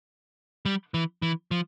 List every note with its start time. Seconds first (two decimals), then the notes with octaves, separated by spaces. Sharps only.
0.66 G3
0.94 E3
1.22 E3
1.51 F3